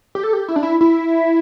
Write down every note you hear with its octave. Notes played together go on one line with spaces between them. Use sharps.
G4
A4
G4
E4
D4
E4
E4